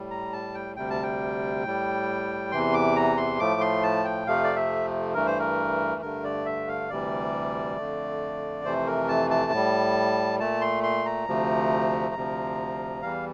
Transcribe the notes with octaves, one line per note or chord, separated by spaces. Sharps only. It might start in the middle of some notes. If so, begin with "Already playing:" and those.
Already playing: A2 G3
A#5
A5
G5
D2 C3 G3 G5
A5
G5
A2 G3
E2 C3 E3 C6
D6
A#5
C6
A2 F3 A3 D6
C6
A5
G5
F2 C3 F3 A3 F5
D5
E5
G2 E3 A3 A#4
C5
A#4
G2 D3 A3 A#4
D5
E5
F5
D2 C3 E3 G3 D5
F2 D3 A3
F2 C3 E3 A3 C5
A#4
A5
A5
A2 G3
A#2 A3 A5
C6
C6
A#5
D2 C3 F3 A3
D2 C3 F3
E2 E3 G3 F5